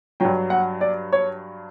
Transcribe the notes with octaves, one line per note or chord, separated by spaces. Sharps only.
G2 F#3 G5
F#5
D5
C#5